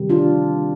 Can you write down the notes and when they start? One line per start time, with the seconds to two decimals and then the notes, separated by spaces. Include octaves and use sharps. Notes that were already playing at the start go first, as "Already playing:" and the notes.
Already playing: C3 D#3 G3
0.09 D4 F4